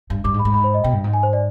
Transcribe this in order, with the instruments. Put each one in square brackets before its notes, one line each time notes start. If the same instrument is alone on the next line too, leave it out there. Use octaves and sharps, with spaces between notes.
[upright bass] G2
[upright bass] G2 [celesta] D6
[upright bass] G#2
[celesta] B5
[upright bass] G#2
[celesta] B5
C5
D#5
[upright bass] B2 [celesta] G5
[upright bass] G2
G#2
[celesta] G#5
C5
D5